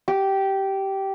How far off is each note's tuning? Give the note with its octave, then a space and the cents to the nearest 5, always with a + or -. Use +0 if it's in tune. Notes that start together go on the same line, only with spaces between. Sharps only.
G4 -15